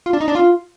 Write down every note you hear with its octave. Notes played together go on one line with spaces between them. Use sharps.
F4
D4
D#4
D4
F4